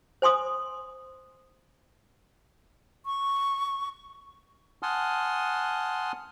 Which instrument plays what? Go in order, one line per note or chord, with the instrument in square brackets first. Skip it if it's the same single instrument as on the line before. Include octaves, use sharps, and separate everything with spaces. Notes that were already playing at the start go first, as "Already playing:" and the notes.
[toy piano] C5 G#5 C6 D#6
[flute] C#6
[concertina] F#5 G#5 A5 C6 D#6 F6